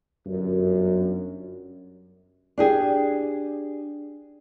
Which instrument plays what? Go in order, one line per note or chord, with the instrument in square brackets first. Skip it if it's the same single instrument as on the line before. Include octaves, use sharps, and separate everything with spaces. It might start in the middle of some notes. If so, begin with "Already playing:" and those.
[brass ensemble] G1 F#2
[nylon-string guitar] D4 G4 G#4